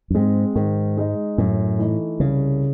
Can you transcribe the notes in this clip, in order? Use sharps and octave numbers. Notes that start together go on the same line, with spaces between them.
F#2
G#2 G#3 C4
G#2 D#3
G#3 D#4
F#2 A2
E3 A3 D#4
C2 C#3